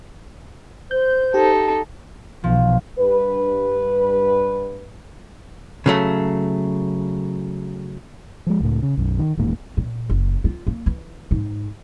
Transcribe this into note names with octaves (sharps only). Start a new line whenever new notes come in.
C5 G6
D#4 G4 A4
B1 F3
G2 B4
C#3 F#3 A3
F3 G#3
C#2 A2
C#3
B1 F#2
D#3
D#1 A1 G#2 A#3
A#2
F#1
F4
A#3
E3
G#2